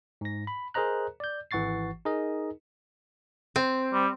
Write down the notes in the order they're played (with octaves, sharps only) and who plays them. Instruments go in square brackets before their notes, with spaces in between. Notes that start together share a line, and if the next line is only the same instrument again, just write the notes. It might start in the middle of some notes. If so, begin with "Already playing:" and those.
[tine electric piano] G#2 A#6
B5
G#4 A#4 C5 D#5 A#5 F#6
D5 G6
G#1 E3 F#5 C#6 A6 C7
D#4 G#4 A#4 D#5
[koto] C4
[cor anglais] G3